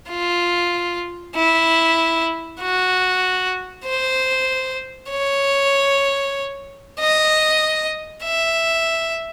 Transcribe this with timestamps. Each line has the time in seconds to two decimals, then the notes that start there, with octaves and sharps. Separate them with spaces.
0.10 F4
1.36 E4
2.61 F#4
3.85 C5
5.11 C#5
6.99 D#5
8.24 E5